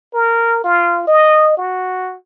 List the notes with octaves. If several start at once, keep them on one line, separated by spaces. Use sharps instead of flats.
A#4
F4
D#5
F#4